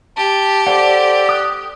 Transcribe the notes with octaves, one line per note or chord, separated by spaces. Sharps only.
G4 A5
A4 C5 D5 F#5
D#6 F#6